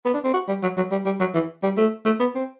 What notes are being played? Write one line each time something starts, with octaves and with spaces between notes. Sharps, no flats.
B3
D4
C4
F#4
G3
F#3
F#3
G3
G3
F#3
E3
G3
A3
A3
B3
C4